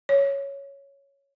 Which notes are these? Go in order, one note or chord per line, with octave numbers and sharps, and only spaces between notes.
C#5